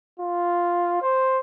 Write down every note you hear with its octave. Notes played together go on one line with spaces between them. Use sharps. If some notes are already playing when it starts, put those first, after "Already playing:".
F4
C5